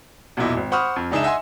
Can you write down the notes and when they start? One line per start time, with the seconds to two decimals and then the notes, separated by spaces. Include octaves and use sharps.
0.37 B1 E2 A#2 E4 D#5
0.57 G#1
0.72 C5 F#5 B5 C#6 D#6 F6
0.96 F2
1.11 C#2 D4 D#4 G#4 E5 E7
1.23 D#5 E5 F#5 G#5 C6